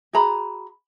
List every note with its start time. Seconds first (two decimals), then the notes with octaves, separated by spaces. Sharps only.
0.13 F#4 G#4 A#5 B5